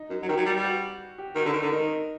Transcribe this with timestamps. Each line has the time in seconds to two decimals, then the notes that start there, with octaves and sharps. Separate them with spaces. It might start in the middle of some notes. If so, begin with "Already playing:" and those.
Already playing: D#4
0.10 F#2
0.22 F#3
0.28 D#3 G4
0.37 F#3
0.46 G3
0.56 G3
0.65 F#4
1.18 G4
1.35 D#3 F#4
1.45 D3
1.53 D#3
1.62 D3
1.72 D#3 D#4